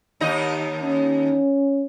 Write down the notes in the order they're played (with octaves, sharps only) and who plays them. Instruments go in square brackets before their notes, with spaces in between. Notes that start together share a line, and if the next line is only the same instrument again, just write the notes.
[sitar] D#2 D#4 D#5
[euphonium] C#4